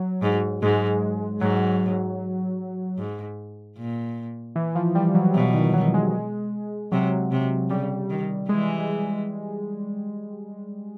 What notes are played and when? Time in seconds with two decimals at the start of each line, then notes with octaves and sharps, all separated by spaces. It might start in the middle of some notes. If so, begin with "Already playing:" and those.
Already playing: F#3
0.22 G#2
0.62 G#2 G#3
1.41 G#2 F#3
2.98 G#2
3.77 A#2
4.56 E3
4.75 F3
4.95 G3
5.15 F#3
5.34 B2 E3
5.54 D#3
5.74 F#3
5.94 G#3
6.92 C3 F#3
7.31 C3
7.70 C#3 G3
8.10 D#3
8.49 E3 G#3